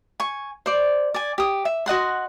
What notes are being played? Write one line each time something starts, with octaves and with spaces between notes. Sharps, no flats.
G#5 C#6
C5 D5
D5 G#5
G4 D#6
E5
F#4 D#5 F#5 C6